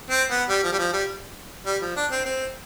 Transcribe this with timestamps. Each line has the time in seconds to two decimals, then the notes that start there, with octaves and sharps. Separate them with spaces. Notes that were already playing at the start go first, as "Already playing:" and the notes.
0.10 C4
0.30 B3
0.49 G3
0.64 F3
0.72 G3
0.79 F3
0.93 G3
1.66 G3
1.82 F3
1.96 D4
2.11 C4
2.25 C4